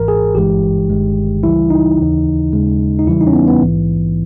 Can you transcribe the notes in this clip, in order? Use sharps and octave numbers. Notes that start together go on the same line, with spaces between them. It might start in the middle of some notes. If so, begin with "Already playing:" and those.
Already playing: G#1 G#2 E3 A#4
G#4
G1 G2 E3 G#3 G4
G1 G2 D#3 G#3
C#2 C#3 E3 G3 E4
D#4
D#2 C#3 E3
D#2 C#3 G#3
D#4
E2 C#3 E3 G3 E4
D#4
C#4
B3
B3
A#1 G#2 E3